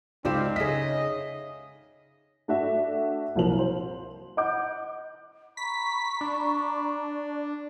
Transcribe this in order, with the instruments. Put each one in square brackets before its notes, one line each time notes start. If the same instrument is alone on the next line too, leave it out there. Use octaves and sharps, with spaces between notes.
[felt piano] C#2 G4 E7 [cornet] C4 [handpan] D#4 F5 [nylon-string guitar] A4 D5
[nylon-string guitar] C#3 E5 [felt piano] G#4 B6 [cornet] D#5
[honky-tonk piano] A3 D4 F#4 A4 E5
C2 A#2 F3 F#3 A#4 F#7
C5
D#5 F#5 D6 G6
[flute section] A#5 B5 C#6 [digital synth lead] B6
[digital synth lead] D4